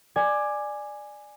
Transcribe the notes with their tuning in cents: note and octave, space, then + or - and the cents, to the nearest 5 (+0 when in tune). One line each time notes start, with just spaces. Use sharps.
D5 +15 G#5 +0